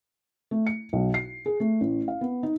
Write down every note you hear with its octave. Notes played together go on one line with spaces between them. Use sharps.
A3
C#7
B1
C7
G#4
A3
A1
F5
B3
D#4